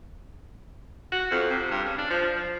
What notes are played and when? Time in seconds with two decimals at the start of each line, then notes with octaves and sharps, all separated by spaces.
1.12 F#4
1.31 F2
1.50 C3
1.71 G2
1.85 C#3
1.98 D4
2.10 F3
2.35 F3